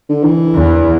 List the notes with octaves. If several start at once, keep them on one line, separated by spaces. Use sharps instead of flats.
D3
E3
E2